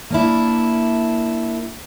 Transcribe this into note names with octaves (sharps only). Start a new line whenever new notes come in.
A#3 D4 E4